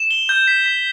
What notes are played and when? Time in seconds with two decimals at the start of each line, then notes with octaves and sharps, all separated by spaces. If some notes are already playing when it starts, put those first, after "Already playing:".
Already playing: E7
0.11 G7
0.29 G6
0.48 B6
0.66 B6